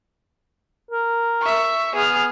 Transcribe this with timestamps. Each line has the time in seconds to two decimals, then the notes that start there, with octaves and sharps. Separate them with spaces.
0.91 A#4
1.41 E5 C#6
1.95 B3 G#4 F6